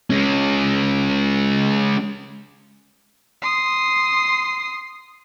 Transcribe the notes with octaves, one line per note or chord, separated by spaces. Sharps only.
G#3 C#4
C6 D#6